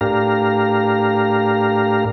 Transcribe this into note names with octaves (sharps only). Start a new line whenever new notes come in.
A2 D4 G4 A#4 F5 A#5